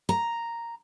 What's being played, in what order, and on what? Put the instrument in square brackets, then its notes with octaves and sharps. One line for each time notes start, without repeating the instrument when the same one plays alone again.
[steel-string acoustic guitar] A#5